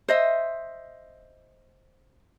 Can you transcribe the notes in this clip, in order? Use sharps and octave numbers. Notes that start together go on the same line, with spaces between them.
C5 D#5 E5